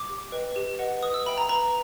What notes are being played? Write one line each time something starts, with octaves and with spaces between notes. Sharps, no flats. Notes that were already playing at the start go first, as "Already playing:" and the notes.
Already playing: D6
G4
B4 D#5 G5
G4
B4 D#5 F#5
B4 D#6
E6
E5 G5 B5
A#5
B4 A#5